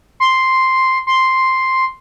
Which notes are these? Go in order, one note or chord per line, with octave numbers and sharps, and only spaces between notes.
C6
C6